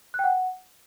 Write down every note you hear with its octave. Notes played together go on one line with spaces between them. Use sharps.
F#6
G5
F#5